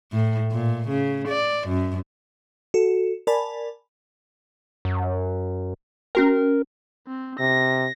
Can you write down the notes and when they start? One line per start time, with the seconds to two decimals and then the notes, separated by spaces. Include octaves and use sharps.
0.12 A2
0.51 A#2
0.88 C#3
1.28 D5
1.68 F#2
2.74 F#4 A4
3.27 A#4 D5 G#5 A5 B5
4.85 F#2
6.15 C#4 F#4 A#4 G5
7.07 C4
7.39 C3 A#6